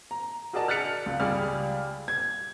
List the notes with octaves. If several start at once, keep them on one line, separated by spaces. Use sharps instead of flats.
A#5
F#4 G#4 A#4 D5 D#5 A5
F6 F#6 A6 B6 C#7 F7
C#2
C#2 G3 G#4 D5 F6
G#6